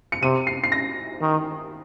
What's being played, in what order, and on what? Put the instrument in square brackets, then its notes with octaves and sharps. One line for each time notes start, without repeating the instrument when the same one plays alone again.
[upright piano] C#7
[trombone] C3 [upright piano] D#7
[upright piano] C7
C7
A#6
[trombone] D#3